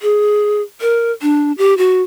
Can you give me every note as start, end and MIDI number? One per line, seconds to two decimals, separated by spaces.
0.02 0.61 68
0.81 1.12 70
1.22 1.52 62
1.58 1.76 67
1.78 2.02 66